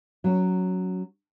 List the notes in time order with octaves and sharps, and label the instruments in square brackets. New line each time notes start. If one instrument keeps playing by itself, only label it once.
[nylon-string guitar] F#3 C#4